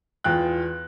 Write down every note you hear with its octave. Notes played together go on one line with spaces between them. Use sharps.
E2 F4 G5 F#6